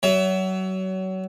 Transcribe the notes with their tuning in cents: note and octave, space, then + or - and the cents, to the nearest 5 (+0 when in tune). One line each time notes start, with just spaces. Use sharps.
F#3 +30 E5 +0